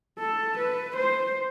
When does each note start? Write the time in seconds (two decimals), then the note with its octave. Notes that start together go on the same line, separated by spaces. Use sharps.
0.18 A4
0.58 B4
0.96 C5